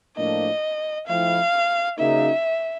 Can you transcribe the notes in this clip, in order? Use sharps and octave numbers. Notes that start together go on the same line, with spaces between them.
A2 F3 A#3 D4 D#5
F3 A3 C4 E4 F5
C#3 F#3 A#3 D#4 E5